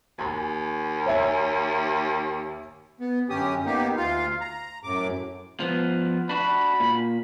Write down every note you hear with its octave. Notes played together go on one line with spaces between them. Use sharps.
D#2 G#5
C#5 E5 G#5
B3
F#2 D3 C#4 G4 D#6
A#3 B3 D#4 G4
D2 F4 F5
A#5
F#2 A2 D6
F3 B3
D4 F#4 B5
A#2